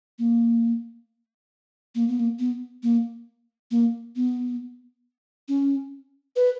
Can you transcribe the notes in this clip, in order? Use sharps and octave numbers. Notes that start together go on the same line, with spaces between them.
A#3
A#3
B3
A#3
B3
A#3
A#3
B3
C#4
B4